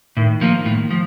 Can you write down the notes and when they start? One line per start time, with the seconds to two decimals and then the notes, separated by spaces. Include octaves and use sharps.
0.17 A2 D#3
0.41 F3 A#3
0.66 A2
0.91 F3